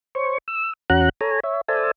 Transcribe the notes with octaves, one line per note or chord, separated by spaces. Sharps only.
C5 C#5 C#6
E6
E2 C#4 F#4 F#5 A#5 F#6
A4 C#5 G#5 A#5
C#5 E5
A4 C5 D5 E5 G#5 A5